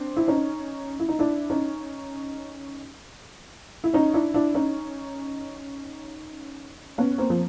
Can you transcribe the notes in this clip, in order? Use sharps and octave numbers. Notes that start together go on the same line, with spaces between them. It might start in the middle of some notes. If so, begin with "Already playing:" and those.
Already playing: C4 D4
E4
C#4 D#4
E4
D#4
D4 E4
C#4 D#4
E4
C#4 D#4
D4 E4
D4 E4
C#4 D#4
B3 C#4
A#3 C4
F3